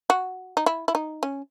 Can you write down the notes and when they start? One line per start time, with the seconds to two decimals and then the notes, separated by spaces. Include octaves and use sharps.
0.10 F#4
0.57 D#4
0.66 E4
0.88 E4
0.95 D#4
1.23 C#4